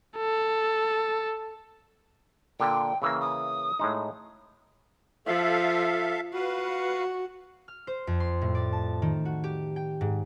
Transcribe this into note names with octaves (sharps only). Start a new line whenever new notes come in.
A4
A#2 D3 G5
C#3 E3 A#3 E6
D#6
A2 G#3 D#4
F3 A4 E5 F5
F#4 B4 F5
F6
C5
F2
C6
A2
D5
A5
D#3
F#4
G4
G5
G#2